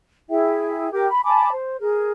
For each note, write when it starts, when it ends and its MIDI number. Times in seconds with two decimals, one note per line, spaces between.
0.29 0.91 64
0.29 0.91 68
0.29 0.91 76
0.29 0.91 79
0.92 1.06 67
0.92 1.06 70
0.92 1.06 79
0.92 1.06 86
1.09 1.21 83
1.24 1.49 80
1.24 1.49 81
1.24 1.49 83
1.24 1.49 86
1.52 1.79 72
1.80 2.12 68
1.80 2.12 70